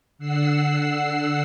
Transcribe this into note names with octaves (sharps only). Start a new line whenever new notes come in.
D3 F#5 E6 C7